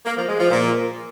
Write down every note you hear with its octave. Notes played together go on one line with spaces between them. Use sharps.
A#3
F3
G#3
F3
A#2